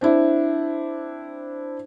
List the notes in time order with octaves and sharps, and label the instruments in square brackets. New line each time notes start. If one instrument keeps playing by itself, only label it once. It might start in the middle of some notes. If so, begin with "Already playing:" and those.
[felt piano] C4 D4 E4